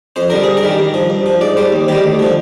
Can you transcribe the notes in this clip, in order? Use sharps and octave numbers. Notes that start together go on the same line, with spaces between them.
F2 C5
D3 G3 A#4
G2 G#4
A#4
D#3 G3
G2
F3
G2
F3
G#2 D5
G3 C5
D#2
D#3 G3 G4
D2
D3 F3